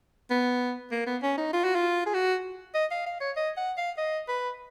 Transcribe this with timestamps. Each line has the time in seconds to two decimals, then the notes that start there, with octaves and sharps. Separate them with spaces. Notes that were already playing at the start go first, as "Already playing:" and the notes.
0.31 B3
0.92 A#3
1.07 B3
1.23 C#4
1.38 D#4
1.53 F4
1.64 F#4
1.75 F4
2.06 G#4
2.14 F#4
2.75 D#5
2.91 F5
3.06 F5
3.21 C#5
3.37 D#5
3.58 F#5
3.78 F5
3.98 D#5
4.29 B4